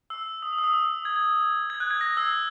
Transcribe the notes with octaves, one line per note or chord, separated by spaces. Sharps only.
E6
D#6
D#6
E6
D#6
E6
G#6
G#6
G#6
F#6
G#6
A#6
E6